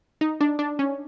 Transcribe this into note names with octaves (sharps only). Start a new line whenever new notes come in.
D#4
D4
D4
C#4